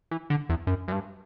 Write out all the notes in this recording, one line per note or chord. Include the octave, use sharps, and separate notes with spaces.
E3
D3
E2
F#2
F#2
G2